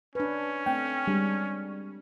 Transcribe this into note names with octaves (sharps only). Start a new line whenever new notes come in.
C#4 D4 B4
A3 C4 G5
G3 G#3 D4